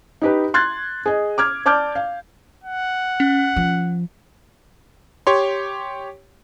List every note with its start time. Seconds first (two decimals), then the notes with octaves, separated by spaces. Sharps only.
0.22 D#4 G4 B4
0.54 C6 F#6 G#6 A6
1.06 G#4 D#5
1.38 D6 F6 G#6
1.66 D5 A5 D6 F6 G6
1.95 F5
2.64 F#5
3.20 C#4
3.56 F3
5.27 G4 C#5 C6